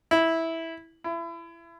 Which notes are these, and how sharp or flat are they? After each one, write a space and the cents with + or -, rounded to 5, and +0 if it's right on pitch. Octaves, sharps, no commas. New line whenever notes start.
E4 -10
E4 +30